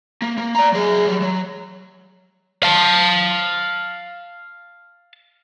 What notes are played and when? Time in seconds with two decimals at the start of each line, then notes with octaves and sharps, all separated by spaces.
0.22 A#3
0.37 A#3
0.55 D5 A#5
0.72 F#3 G#4
1.06 F#3 G3
1.22 F#3
2.63 F5 A5